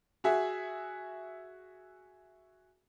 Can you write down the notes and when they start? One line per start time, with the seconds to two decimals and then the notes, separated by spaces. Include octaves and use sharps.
0.24 F#4 G#4 E5